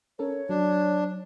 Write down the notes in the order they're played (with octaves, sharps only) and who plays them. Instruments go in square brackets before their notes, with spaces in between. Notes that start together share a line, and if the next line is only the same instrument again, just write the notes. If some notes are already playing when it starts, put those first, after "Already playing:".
[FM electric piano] C#4 A4 A#4 [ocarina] C#5
[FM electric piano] F#3 [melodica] D4